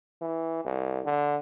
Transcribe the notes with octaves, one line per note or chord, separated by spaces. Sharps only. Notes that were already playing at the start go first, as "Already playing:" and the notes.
E3
C2
D3